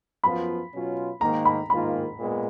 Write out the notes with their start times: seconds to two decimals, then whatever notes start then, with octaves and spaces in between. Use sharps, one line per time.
0.24 F#2 F3 B3 F4 B5
0.72 B2 F#3 C#4 F4
1.21 G#2 D#3 A#3 A#5
1.45 B5
1.70 G#2 D#3 A#3 F4 B5
2.19 A#2 G#3 B3